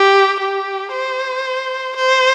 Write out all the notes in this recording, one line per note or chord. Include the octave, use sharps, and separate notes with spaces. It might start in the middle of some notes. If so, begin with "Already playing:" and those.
Already playing: G4
G4
C5
C5